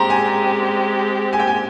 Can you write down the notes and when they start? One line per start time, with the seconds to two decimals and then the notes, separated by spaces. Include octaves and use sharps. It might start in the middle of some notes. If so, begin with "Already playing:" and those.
Already playing: G#3 C4 G4 A#5 C6
0.10 G#5
1.33 G#5
1.39 G5
1.47 G#5